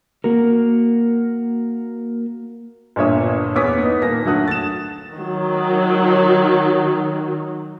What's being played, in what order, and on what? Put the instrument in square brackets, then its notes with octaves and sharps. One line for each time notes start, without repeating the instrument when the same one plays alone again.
[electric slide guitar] A#3 F#4 A#4
[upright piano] G1 A#2 D3 C#5 E5 D#6
E2 B3 C#5 D6 D#6 B6
B3 D#4
D#1 A#3 A#6
D3 F#3 A3 F#5 D#6 F#6
A6 E7
[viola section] D#3 F#3